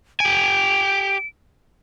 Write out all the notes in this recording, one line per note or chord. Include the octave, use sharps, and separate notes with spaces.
G4 G#5 D7